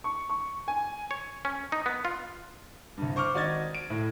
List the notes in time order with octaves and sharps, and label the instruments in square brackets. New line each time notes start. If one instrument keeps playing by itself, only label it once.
[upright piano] C#6
C#6
G#5
[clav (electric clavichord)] C#5
C#4
D#4
B3
F4
[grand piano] C2 G2
C5 C#6 D6 F6
G#1 F#4 D5 D#5 G#6 A6
D7
A2